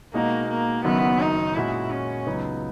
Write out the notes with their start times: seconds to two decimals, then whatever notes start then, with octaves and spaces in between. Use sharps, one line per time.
0.14 B2 G#3 A#3 D#4 F#4 A#4
0.49 A#3
0.84 F#1 F#2 D#3 F#3 B3
1.20 D#4
1.55 A#2 G#3 C#4 E4 F#4
1.91 C#4
2.26 C#2 C#3 F#3 B3 D#4